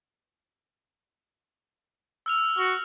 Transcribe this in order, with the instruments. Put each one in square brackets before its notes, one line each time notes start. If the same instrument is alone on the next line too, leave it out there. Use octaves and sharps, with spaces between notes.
[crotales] E6 F6 F7
[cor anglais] F#4 [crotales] F6